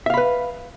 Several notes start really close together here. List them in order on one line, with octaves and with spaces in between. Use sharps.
E5 F5 B5 B4